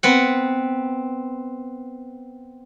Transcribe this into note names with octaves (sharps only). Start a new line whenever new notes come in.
B3 C4 F#5